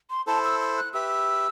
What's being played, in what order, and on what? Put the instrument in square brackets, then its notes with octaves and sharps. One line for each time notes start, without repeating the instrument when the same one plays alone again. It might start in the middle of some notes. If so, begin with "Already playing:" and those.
[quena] C6
[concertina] E4 A4 C5 [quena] A5
[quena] E6
E6
F#6
[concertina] G4 B4 E5 [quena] E6